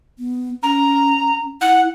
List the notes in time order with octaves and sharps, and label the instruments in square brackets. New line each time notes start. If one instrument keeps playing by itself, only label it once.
[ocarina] B3
[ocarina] C#4 [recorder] A#5
[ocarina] E4 [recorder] F#5